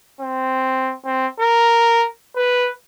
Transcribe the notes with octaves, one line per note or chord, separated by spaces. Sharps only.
C4
C4
A#4
B4